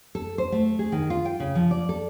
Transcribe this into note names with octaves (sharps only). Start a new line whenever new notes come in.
A4
C5
A3
G#4
D#3
F4
G5
C#3
F3
D5
A4